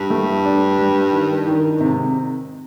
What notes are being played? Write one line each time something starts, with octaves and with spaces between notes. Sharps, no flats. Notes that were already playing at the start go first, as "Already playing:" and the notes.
Already playing: G2
A3
D4
G3
D#3
D#3
G#2 C3